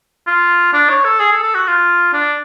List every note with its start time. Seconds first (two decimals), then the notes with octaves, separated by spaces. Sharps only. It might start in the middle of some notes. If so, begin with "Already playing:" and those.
0.27 F4
0.73 D4
0.89 C#5
1.05 A4
1.20 G#4
1.32 A4
1.43 A4
1.55 F#4
1.67 F4
2.13 D4